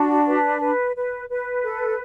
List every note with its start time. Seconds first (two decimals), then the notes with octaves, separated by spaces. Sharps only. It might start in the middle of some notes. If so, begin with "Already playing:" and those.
Already playing: D4 F#4
0.26 B4
0.60 B4
0.96 B4
1.29 B4
1.63 A4